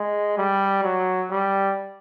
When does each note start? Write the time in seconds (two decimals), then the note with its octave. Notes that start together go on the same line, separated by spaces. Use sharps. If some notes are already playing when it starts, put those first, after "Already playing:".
Already playing: G#3
0.38 G3
0.84 F#3
1.31 G3